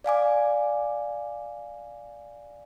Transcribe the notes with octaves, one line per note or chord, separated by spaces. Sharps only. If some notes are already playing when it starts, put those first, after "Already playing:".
D5 F5 G#5 D6